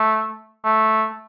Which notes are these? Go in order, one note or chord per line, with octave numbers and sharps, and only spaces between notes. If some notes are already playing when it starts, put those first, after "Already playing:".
Already playing: A3
A3